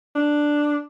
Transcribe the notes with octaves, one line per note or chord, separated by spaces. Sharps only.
D4